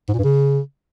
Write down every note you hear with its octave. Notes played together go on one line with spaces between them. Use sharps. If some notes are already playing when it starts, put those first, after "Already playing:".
G#2
A#2
G2
C#3